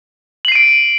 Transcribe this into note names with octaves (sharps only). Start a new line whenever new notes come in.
C7 D7 D#7 F#7